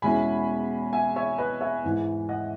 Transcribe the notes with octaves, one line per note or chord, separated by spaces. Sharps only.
E2 B2 G#3 C#4 E4 G#5 B5
E5 G#5
C#5 E5
B4 D#5
C#5 E5
G#2 E3 G#3
D#5 F#5